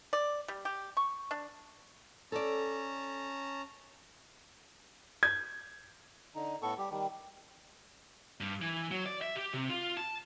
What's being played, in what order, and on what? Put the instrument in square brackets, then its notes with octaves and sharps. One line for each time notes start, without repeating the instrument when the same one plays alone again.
[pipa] D5
G3
G4
C#6
D4
[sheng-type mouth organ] C#4 A5 A#5 [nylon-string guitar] A4 D5
[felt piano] G6 G#6
[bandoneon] D3 D#4
A2 B3 A4 C#6
G3 G4
D#3 G3
[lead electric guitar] G2
E3
F#3
D5
E5
G4
C3
F4
A5